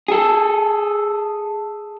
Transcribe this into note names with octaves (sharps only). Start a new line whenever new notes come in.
G#4 A4